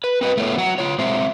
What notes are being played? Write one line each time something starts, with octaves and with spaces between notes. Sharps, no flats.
B4
C4 B4 D#5
A3 B3 C#5
F#3 F#5
F4 C#5
G#3 C4 C5 E5